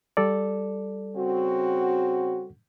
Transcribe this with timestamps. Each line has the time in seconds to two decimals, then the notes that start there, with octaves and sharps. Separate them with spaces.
0.17 G3 A4 D5
1.16 C#3 C4 F#4